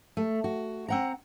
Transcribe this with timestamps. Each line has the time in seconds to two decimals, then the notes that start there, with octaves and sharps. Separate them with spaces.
0.17 A3
0.44 F#4
0.88 C4 F#5 A#5